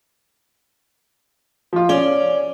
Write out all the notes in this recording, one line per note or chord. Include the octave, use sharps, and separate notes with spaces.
F3 F4
C#4 D5 G7